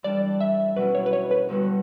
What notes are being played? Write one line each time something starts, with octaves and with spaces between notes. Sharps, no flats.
E3 G3 D4 A4 D5
E5
B2 F#3 C#4 E4 B4
C#5
B4
C#5
B4
G2 D3 G3 B3 F#4